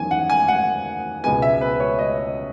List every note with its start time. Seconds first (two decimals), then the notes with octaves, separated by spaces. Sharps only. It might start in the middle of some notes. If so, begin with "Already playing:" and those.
Already playing: E2 D#3 F#3 C#4 G#5
0.11 F#5
0.30 G#5
0.48 F#5
1.24 C#2 B2 G#3 B3 G#5
1.42 E5
1.61 B4
1.80 C#5
1.99 D#5